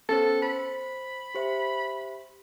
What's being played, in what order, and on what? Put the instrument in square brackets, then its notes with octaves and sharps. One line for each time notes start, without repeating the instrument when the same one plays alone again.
[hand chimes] B3 C#4 C5 [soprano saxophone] A4
[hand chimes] C5 [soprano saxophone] B5
[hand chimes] G4 C5 E5